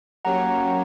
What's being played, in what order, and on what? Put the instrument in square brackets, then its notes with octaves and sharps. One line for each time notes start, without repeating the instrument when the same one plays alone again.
[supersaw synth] F#3 A#3 C#4 G4 C#5 [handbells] F#5 A#5